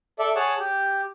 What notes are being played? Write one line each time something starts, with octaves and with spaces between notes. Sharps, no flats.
A4 D5 E5
G#4 C#5 F#5 A5
G4